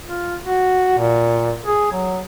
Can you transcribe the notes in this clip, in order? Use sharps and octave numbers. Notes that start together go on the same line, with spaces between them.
F4
F#4
A#2
G#4
F#3